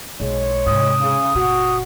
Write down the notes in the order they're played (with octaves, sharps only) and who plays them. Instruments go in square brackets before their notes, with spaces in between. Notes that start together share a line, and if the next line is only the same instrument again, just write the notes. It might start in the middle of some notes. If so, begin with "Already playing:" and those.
[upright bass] B1 [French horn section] G#3 C#5
[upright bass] G#2 C3 [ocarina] D#6
[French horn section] C#3
[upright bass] F#1 A#2 [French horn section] F#4